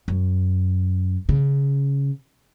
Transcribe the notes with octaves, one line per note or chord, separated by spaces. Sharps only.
F#2
C#3